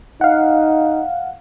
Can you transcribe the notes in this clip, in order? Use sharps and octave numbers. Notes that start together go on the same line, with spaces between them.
D#4 F5 F#5